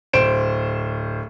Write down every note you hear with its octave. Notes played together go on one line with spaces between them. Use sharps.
D1 C5 D7 E7